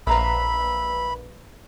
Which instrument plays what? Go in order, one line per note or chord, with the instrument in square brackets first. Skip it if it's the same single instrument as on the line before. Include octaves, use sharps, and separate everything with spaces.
[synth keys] A#1 B4 [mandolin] E5 F5 A#5 [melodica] B5